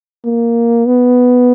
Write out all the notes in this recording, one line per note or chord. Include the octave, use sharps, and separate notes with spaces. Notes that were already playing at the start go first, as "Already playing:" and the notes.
A#3
B3